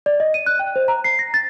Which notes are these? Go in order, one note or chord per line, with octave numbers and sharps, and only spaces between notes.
D5
D#5
D#7
F#6
G5
C5
A#5
C7
A#6
A6